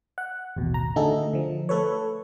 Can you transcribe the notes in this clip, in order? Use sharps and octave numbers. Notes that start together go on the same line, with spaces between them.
F#5
A1 D#2 B2
A#5
D3 A3 D#4 F#4 G#4 A4
D3 F3
A3 A4 B4 C#5